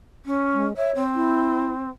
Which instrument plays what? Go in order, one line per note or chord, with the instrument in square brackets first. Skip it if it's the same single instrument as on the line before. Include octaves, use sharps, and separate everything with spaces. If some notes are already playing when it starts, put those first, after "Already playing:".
[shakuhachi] C#4
[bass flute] G#3
[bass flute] C#5 [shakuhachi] E5
[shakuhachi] C4
[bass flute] E4